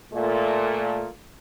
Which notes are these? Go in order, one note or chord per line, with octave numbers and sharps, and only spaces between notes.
A#2 A3